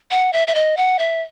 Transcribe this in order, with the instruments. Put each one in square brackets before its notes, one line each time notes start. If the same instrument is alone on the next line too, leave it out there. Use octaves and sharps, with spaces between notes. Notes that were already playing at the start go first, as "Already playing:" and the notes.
[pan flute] F#5
E5
E5
D#5
F#5
E5